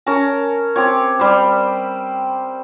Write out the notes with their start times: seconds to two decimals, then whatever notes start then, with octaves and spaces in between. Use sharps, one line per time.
0.06 C#4 A#4 A5 A#5
0.76 C4 G4 C#5
1.19 G3 C5